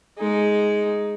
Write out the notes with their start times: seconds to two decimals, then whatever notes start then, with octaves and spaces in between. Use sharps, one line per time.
0.18 G#3 D#4